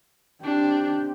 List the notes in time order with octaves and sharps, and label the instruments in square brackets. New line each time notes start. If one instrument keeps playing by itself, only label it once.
[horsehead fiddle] C4 G4 [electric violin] D4